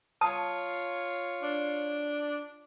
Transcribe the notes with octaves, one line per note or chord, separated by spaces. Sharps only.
F4 C#5 A5 D#6
D4